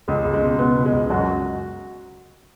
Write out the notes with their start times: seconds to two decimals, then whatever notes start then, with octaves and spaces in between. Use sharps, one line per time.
0.08 C#2 G#3
0.25 C#2
0.34 G#3
0.42 B2
0.59 B2 B3
0.77 C#2
0.85 G#3
0.93 C#2
1.10 F#2 F#4